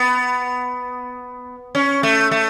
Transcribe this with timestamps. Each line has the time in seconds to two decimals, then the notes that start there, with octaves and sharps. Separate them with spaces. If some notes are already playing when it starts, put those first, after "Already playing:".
Already playing: B3
1.75 C#4
2.03 A3
2.31 A3